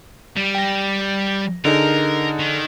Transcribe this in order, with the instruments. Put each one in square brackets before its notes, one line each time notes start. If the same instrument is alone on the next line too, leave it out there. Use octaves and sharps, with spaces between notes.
[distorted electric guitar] G3
[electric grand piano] G5 A#6
[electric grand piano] D3 D#4 G#4 [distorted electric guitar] A#4
[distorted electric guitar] D#3